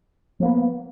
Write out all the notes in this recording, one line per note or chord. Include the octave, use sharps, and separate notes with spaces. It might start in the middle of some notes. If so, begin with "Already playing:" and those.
F3 A#3 B3